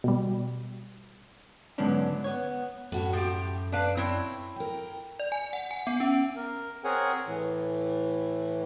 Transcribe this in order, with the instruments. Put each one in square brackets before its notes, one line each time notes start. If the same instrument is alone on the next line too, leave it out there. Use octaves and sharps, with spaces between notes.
[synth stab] B2 G3
[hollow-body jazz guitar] G#2 D3 F#3 B3 C#4 D4
B3 C#5
[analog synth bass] F#2 [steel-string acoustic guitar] A2 F#4 C#5
[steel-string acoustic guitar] A2 [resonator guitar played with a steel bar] F3 G4
[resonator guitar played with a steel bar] D4 B4 F5
[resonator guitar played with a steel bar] C4 E4 [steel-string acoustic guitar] C#5
[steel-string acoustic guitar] A#4 G5
[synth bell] D5
G#5
F#5
G#5
B3
C#4
[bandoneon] A#4
C4 G#4 A#4 C#5 F#5 G#5
A2 E3